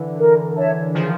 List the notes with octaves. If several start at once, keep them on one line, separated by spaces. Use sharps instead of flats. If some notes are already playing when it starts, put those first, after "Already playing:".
Already playing: D3 E3
A#4
C#5 E5 A5
D#3 F3 G#4